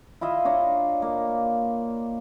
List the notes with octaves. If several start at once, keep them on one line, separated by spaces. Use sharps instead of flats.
E4 F4 D#5 E5
D4 C#5 D#5 A#5
A#3